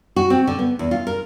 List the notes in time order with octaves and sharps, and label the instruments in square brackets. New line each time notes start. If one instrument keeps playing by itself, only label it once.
[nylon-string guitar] F#4
C4
D3
B3
E2
F4
A#4